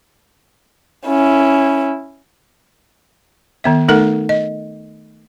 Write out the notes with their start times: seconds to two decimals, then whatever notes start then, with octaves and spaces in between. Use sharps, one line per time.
1.06 C#4 E4
3.64 D#3 B3 E5
3.88 A3 D#4 A4 A#4 F#5
4.29 D#5